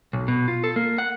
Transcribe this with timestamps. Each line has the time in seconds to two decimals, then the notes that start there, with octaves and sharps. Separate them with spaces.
0.13 B1
0.28 B2
0.48 F4
0.64 A4
0.76 A#3
0.98 F#5